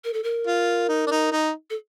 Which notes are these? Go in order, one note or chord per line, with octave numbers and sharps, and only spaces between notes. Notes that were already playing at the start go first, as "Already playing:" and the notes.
A#4
A4
A#4
F4
D#4
D4
D#4
D#4
A4